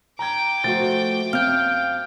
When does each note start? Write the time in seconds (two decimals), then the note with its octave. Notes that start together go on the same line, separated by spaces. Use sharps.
0.19 G5 A#5 D6 G#6
0.64 F3 A3 F#4 C5 A6
1.33 F#2 C4 F5 F6 G6